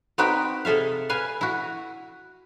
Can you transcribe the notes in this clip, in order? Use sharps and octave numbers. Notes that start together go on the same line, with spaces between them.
B3 C4 D#4 F#4 B4 G5
C3 G#4 A4 E5 F5
B4 F5 G#5
E4 F#4